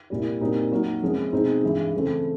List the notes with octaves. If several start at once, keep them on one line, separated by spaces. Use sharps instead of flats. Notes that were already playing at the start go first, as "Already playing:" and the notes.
C2 A#2 G3
A#2 G3 C4 D#4 F#4
F#3 A#3 D#4 F#4 A#4
C3 F3 G#3 C#4 F4
B2 G#3 C4 D#4 G#4
G2 E3 G#3
C#3 E3 A3 C4